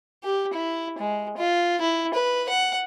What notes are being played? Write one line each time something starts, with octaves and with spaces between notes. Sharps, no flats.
G4
E4
G#3
F4
E4
B4
F#5